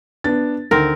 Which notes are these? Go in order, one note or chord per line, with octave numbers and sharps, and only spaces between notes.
B3 D4 A6
D2 D#3 C4 A#4